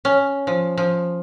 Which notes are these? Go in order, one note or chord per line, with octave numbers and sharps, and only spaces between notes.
C#4
F3
F3